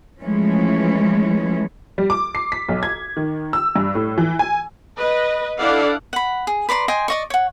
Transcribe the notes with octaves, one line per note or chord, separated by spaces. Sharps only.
E3 F3 G#3 A3 C#4
G3
D6
C7
B6
B1
G#6
D#3
E6
G2
A2
E3
G#5
B4 D#5
D4 E4 A4 D5 F5 F#5
F#5 B5
G#4
B4 D5 A#5 C6
D#5 G5 G#5 C6
D5 D#5 C#6
C#5 F#5